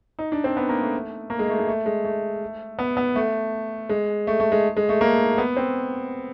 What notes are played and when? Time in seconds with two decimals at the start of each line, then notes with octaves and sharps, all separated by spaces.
0.19 D#4
0.32 D4
0.44 C4
0.57 B3
0.69 A#3
0.82 A3
1.30 A#3
1.39 G#3
1.50 A3
1.59 G#3
1.68 A3
1.86 G#3
2.05 A3
2.79 B3
2.97 B3
3.16 A3
3.89 G#3
4.27 A3
4.40 A3
4.52 G#3
4.77 G#3
4.89 A3
5.01 A#3
5.38 B3
5.57 C4